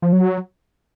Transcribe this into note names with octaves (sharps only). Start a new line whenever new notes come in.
F3
F#3